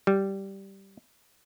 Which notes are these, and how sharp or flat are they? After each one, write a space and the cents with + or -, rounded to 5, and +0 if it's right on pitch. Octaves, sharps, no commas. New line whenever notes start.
G3 -10